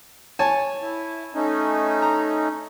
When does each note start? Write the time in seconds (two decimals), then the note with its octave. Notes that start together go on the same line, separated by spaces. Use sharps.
0.39 C#5 G#5 A5
0.82 E4
1.34 A3 C#4 D#4
2.02 A#5